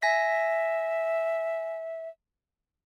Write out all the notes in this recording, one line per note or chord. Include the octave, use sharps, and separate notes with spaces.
E5 G#5 A#6 B6